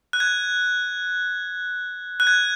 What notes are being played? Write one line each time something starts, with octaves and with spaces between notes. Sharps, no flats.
F#6
G#6
F#6
G#6